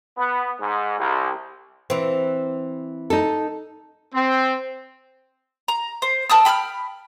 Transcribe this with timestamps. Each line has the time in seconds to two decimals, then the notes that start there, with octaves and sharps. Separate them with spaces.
0.18 B3
0.59 G#2
0.99 C2
1.90 E3 C4
3.10 D#4 A4
4.15 C4
5.68 A#5
6.02 C5
6.29 A#4 A5 D#6 E6
6.45 G5 B5 E6 F6